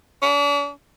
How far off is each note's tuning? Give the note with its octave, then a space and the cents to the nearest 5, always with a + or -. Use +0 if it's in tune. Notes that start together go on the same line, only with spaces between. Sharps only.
D4 -45